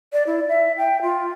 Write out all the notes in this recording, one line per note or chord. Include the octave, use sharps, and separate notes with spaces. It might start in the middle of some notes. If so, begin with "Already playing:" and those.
D5
E4
E5
G5
F4